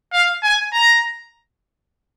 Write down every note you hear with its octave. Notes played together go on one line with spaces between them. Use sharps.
F5
G#5
A#5